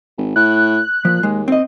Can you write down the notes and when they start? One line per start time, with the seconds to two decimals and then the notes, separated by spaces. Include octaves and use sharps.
0.18 G#1
0.36 A2 F#6
1.05 A#2 F3
1.23 D#2 G#3
1.48 C4 D#5